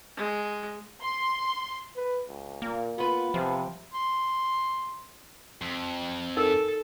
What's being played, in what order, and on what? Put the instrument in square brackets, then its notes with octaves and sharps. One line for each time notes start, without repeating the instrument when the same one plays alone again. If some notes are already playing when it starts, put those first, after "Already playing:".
[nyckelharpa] G#3
[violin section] C6
[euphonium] B4
C#2
[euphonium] A#2 [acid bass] A#3
[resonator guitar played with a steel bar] B3 B4 [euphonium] F4
[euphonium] C3 [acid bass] F3
[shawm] C6
[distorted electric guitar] F2
[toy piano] D#4 A#4 G#5 [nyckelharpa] A4